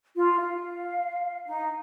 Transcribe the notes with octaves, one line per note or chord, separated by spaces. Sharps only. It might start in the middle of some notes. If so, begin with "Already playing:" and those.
F4
F5
D#4